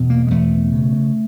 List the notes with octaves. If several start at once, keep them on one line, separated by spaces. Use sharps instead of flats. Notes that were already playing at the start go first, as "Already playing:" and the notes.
Already playing: E2 B2
A#3
G#3
E2 A3
C#3